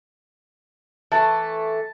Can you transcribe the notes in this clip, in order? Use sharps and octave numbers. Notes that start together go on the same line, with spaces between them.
E3 A3 A5